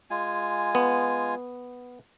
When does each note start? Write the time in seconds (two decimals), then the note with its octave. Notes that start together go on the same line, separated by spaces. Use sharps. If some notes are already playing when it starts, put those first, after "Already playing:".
0.10 G#3 F4 G#5
0.75 B3